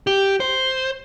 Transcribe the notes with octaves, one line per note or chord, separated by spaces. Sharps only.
G4
C5